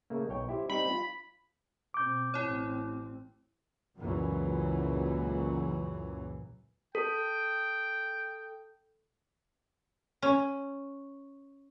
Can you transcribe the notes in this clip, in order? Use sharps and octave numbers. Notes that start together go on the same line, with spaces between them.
C#3 A3 A#3
B1 C#5 G5
E4 G4 C5
G3 C4 D#4 B5
F4
B2 C4 D6 G6
A1 C4 E4 C#5
C#2 F#2 A#2 E3 F#3
A4 G5
C#4